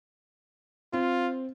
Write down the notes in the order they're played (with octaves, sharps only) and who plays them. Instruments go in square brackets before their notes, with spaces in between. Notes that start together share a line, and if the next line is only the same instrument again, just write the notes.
[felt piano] C4 [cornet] F4